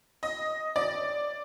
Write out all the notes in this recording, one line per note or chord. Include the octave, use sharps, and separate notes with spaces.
D#5
D5